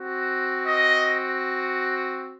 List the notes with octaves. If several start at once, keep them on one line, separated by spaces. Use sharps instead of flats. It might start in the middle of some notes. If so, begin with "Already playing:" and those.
Already playing: C4 F#4
D#5